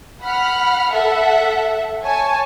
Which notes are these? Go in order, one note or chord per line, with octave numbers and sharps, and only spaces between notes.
F#5 B5 F6
A4 E5 F#5
C#5 G#5 A5